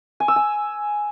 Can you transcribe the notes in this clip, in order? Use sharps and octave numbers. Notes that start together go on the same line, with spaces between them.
G#5
E6
G#5